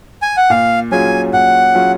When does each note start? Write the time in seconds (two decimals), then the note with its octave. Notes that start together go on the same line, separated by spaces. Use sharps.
0.22 G#5
0.37 F#5
0.50 A#2 F5
0.91 F#3 C#4 F4 G#4 G#5
1.33 A#2 F#5
1.75 F#3 C#4 F4 G#4